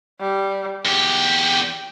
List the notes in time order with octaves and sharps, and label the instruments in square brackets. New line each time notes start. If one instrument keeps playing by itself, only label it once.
[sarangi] G3
[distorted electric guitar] E2 G4 [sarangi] G5